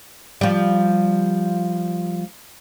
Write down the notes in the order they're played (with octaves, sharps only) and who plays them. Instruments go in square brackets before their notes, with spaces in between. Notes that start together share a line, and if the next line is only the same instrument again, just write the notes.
[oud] F3 G3